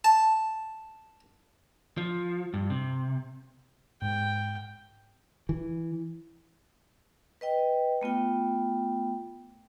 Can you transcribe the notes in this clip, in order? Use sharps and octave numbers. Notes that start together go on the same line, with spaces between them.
A5
F3
G2
C3
G#2 G5
E3
B4 D#5 G5
A3 B3 F4 G5